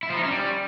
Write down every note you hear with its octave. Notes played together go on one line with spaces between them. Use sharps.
E4
F3
D#4
C#4
G3